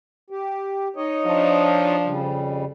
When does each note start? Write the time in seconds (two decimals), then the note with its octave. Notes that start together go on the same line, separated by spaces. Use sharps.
0.30 G4
0.96 D#4 C#5 D#5
1.26 F3 D4
2.05 F2 C#3 G3